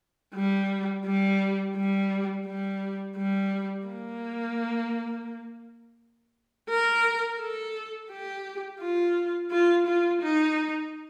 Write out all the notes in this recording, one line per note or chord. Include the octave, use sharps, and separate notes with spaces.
G3
G3
G3
G3
G3
A#3
A#4
A4
G4
F4
F4
F4
D#4